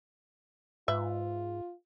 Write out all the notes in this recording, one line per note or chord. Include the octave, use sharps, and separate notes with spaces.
G#2 F4 B4 E5